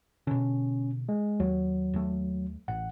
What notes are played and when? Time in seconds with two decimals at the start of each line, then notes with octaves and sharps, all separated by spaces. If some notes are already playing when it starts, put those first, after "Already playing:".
0.27 B2 D3 C#4
1.09 G#3
1.40 D#2 F#3
1.94 D#2 A3
2.68 A1 F#5